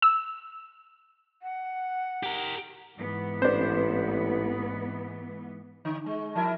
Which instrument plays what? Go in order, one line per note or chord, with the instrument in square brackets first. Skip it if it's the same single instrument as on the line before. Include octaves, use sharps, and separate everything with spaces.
[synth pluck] E6
[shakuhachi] F#5
[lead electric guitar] G4 A#4
[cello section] G#2 E3 B3
[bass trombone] A1 [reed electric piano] C4 B4 [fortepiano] D4 C5
[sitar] D3
G#3
[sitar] F3 E4 A#4 [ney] A5